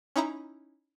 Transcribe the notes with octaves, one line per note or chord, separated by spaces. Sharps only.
C#4 D#4 E4 A#5